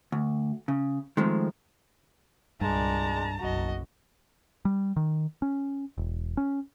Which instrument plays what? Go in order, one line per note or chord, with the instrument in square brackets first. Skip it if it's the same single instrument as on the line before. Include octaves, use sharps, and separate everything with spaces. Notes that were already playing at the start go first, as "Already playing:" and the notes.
[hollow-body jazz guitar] D2
C#3
D#3 F3 G#3 A3 C4
[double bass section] C2 A#2 [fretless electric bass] G2 [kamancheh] G#3 D5 [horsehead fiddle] A5 A#5
[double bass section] F#1 B1 F#2 [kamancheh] F#4 D#5
[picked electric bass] G3
D#3
C#4
E1
C#4